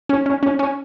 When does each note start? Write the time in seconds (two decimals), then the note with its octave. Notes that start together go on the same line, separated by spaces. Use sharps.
0.09 C#4
0.26 C#4
0.43 C#4
0.59 C#4